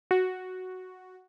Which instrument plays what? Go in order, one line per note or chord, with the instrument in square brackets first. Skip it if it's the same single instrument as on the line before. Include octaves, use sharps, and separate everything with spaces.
[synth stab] F#4